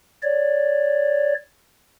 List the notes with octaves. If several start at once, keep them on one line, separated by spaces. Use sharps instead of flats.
C#5 D5